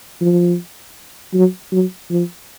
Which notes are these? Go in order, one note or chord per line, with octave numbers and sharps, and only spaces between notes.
F3
F#3
F#3
F3